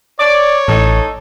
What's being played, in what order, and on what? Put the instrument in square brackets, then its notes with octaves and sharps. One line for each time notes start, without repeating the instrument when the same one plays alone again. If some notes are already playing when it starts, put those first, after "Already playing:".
[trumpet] C#5 [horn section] D5
[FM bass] A1 [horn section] D#4 A4